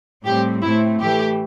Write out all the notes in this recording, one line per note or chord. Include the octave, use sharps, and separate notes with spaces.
A2 G3 C4 G4
A2 A3 C4 E4
A2 E3 A3 G4